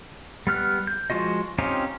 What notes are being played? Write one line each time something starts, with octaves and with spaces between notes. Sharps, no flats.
G3 B3 F6 F#6
G6
F3 G#3 F4 F#4 D#5
C4 C#4 D#4 F4 G4